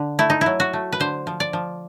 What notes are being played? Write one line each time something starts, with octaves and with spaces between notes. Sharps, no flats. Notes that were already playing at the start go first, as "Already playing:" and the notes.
Already playing: D3
A3 E4
D#4
F#3 E4
F#4
A3
B4
D3 C5
F3
D5
F3